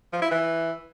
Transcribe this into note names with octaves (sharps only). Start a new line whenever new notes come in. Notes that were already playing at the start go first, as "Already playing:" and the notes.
F3
E4
E3